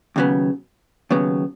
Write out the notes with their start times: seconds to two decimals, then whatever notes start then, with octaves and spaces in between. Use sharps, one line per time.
0.16 D#2 C#3 F#3 B3
1.10 D#2 C#3 F#3 B3